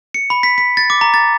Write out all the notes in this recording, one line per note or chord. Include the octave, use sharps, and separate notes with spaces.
C#7
B5
B6
B6
A6
D6
A#5
A6